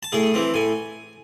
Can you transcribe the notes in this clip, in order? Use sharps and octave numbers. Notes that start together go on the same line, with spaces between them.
A5
A2 G#4 G#5
E3 C4
A2 G#5